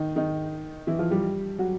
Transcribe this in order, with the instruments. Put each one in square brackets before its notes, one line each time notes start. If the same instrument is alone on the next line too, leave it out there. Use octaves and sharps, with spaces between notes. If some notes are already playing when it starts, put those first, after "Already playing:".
Already playing: [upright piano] D#3 D#4
D#3 D#4
E3 E4
F3 F4
G3 G4
F#3 F#4